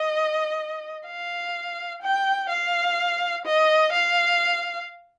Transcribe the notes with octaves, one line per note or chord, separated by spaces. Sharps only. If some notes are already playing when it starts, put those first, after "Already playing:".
Already playing: D#5
F5
G5
F5
D#5
F5